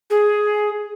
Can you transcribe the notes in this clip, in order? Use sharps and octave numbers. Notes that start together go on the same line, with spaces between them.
G#4